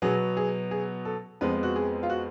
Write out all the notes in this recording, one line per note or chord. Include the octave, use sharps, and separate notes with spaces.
B2 F#3 B3 G#4
G#4
G#4
A4
F2 F3 G#3 B3 B4
F#4
G#4
F4
F#4